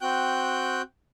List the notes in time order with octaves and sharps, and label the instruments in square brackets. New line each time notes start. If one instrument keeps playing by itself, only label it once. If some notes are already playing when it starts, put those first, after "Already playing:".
[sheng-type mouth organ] C4 F#4 G5 F#6 G6